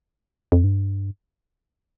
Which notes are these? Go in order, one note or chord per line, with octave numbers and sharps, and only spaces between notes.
F2
G2